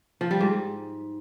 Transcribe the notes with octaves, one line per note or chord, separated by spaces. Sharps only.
F3
G3
G#2